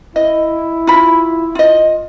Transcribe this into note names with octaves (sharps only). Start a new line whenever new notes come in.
E4 D#5
F4 B5
F4 D#5